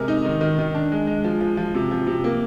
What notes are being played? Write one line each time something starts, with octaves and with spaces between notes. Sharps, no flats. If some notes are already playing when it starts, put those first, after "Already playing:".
Already playing: C3 G#3 A#4
D#4
D#3
D#3
D#3
D4
G#3
G#3
F3
F3
F3
C3
F3
C3
A#3